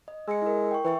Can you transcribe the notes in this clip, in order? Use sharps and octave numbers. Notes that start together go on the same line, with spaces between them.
D#5
G#3 E6 C#7
E4 A#4
G5 C#6
E3 B4 E5 C#6